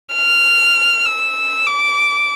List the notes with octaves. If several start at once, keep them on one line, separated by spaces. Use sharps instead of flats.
F6
E6
D6